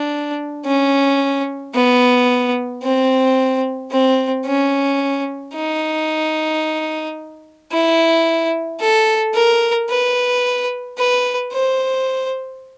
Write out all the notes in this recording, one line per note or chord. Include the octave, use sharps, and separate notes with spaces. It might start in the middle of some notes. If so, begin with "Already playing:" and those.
Already playing: D4
C#4
B3
C4
C4
C#4
D#4
E4
A4
A#4
B4
B4
C5